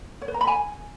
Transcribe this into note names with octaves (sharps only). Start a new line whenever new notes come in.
C#5
B4
A#5
B5
G#5